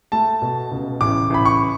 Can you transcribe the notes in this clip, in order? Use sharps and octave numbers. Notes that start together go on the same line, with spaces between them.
A3 A5
B2
C#2
A1 D6
A1 B5
C#6